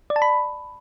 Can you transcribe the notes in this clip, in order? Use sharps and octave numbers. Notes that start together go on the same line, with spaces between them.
D5
A5
B5